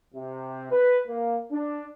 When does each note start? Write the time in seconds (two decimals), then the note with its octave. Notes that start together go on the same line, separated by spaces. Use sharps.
0.14 C3
0.70 B4
1.07 A#3
1.50 D4